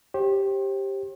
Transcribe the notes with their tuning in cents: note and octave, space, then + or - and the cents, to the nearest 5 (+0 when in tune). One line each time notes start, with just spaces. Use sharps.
G4 +0 C5 +40